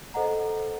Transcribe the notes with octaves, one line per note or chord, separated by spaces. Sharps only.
A4 C5 D#5 F#5 A#5